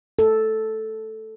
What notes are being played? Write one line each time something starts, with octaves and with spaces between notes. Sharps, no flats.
A4